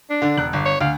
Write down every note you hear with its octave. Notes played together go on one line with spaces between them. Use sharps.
D4
D3
E1 F#6
G1
C#5
D2 F5